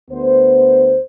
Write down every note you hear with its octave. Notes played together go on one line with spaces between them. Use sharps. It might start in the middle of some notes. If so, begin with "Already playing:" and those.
D2 B3 C5